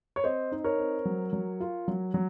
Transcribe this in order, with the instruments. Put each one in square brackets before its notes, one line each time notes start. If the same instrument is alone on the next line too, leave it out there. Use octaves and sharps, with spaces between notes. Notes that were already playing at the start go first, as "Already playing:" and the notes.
[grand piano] C#5
C4 C5 D#5
D#4
A#4 C#5
C4
F#3
F#3
F4
F#3
F#3